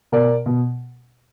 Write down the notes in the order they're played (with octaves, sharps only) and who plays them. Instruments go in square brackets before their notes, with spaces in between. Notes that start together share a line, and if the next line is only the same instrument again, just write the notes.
[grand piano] B2 A#4 D5
B2